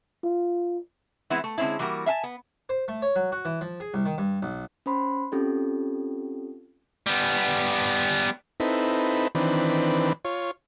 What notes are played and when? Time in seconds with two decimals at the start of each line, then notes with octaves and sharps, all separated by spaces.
0.24 F4
1.30 E3 G#3 B3 C4 E4
1.44 A3
1.58 D3 G#3 A3 C4 C#4 E4
1.79 E3 G3 A#3 F#4 A#4
2.06 E5 F5 G#5 A5
2.24 B3
2.69 C5
2.88 A3
3.02 C#5
3.16 F#3
3.32 F#4
3.45 E3
3.61 F3
3.80 G#4
3.94 C2
4.05 D#3
4.18 G2
4.42 B1
4.86 C#4 C5 B5 C6
5.32 C4 C#4 F4 G4 A4
7.07 G3 B3
8.60 C4 D#4 E4 A4 B4
9.35 D#3 E3 C4 D4 B4
10.25 F4 C#5